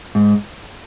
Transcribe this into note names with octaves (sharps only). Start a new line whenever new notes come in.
G#2